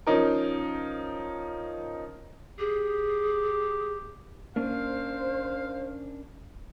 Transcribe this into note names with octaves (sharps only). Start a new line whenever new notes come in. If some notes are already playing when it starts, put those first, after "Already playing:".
F3 C#4 D#4 A#4
G4 G#4
A#3 C#4 D4 A#4 C5 F5